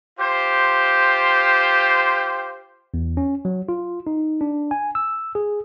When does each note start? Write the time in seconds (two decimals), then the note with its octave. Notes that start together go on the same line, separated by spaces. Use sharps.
0.20 F4 G4 C5
2.94 E2
3.17 C#4
3.45 F#3
3.69 F4
4.07 D#4
4.41 D4
4.71 G#5
4.95 E6
5.35 G#4